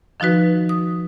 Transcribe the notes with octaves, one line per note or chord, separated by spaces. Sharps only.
D#3 F3 D#4 F#4 B4
D#6